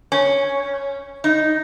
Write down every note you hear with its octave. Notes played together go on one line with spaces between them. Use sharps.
C#4
D#4